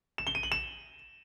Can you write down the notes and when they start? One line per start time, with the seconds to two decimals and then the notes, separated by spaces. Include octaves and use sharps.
0.18 E7
0.27 G7
0.35 D#7
0.43 F#7
0.52 E7